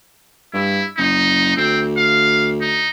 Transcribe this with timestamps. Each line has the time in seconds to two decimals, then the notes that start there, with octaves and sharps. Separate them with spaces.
0.54 G2 E4
0.98 F#1 D#4
1.57 D2 C4
1.98 F5
2.61 D#4